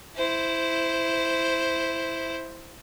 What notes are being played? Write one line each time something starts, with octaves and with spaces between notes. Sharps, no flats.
E4 C5